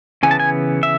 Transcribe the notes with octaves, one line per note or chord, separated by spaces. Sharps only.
C#3 E3 B3 G#5
A5
G#5
E5